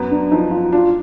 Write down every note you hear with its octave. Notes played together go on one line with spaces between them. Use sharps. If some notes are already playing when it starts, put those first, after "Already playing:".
Already playing: F#2 B3
D4
F3 D#4
F4
D4 F4